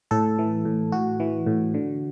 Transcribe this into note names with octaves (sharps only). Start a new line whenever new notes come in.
A2 A4
E3
A2
A2 F#4
E3
A2
D3